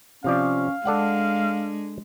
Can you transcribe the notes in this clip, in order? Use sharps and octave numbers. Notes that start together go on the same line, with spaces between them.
C3 F3 C#4 D5 F5
G#3 D4 A4 D5 F#5